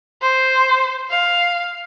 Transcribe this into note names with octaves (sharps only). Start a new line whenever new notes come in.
C5
F5